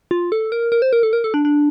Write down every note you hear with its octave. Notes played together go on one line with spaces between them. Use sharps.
F4
A4
A#4
A#4
C5
A#4
A4
A#4
A4
D4
D4